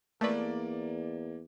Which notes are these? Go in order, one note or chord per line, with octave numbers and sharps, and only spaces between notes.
E2 A3 A#3 B4 D5